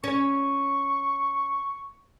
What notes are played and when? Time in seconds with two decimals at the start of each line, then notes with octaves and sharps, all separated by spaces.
0.04 C#4 C#6